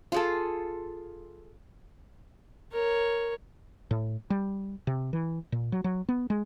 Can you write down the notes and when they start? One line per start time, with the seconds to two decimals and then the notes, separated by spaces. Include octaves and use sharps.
0.12 F4 G#4 A4
2.72 A#4 C#5
3.91 A2
4.30 G3
4.87 C3
5.13 E3
5.52 A#2
5.72 F#3
5.84 F#3
6.09 B3
6.30 G#3